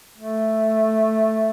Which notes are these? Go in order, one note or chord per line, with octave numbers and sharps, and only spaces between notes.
A3